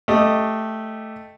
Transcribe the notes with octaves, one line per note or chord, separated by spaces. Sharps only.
A3 G4 D#5